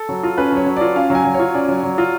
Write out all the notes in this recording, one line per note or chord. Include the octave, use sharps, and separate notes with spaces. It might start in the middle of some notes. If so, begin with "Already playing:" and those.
Already playing: A4
F#3
F4
C#4 B4
F#3 C#5
F#3
F4 D5
C#4 F5
F#3 G#5
F#3
C#5
F4
C#4 D5
F#3
F#3
F4